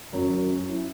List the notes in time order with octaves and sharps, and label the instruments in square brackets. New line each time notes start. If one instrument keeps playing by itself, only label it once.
[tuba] F#2 [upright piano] F#3
[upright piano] F#3
C#4
E4